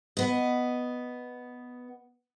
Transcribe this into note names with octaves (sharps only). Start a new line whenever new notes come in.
B3 D#5